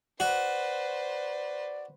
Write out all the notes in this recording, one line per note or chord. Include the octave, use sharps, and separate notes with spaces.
F#4 B4 C5 D5